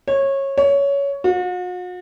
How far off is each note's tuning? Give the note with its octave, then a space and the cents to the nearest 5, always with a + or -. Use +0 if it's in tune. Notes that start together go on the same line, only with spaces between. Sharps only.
C#5 -20
C#5 +15
F#4 -45